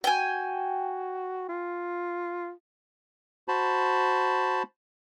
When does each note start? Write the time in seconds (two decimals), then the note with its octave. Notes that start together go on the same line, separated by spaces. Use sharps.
0.04 F#4 G5 G#5
1.49 F4
3.48 F#4 C5 A5 B5